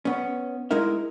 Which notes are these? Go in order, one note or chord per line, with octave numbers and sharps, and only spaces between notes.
B3 C#4
G#3 D#4 E4 A#4 E5